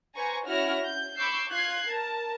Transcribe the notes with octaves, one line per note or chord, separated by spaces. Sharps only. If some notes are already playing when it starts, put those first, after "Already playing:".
B4 C5 G#5 A#5 C#6
C#4 E4 F#4 F6 A#6
G6
B5 C#6 D6 E6 G6 C7
F4 F#6 G#6 C7
A#4 A5